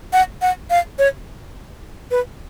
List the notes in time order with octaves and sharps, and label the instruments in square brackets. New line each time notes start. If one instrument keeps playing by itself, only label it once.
[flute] F#5
F#5
F5
C#5
B4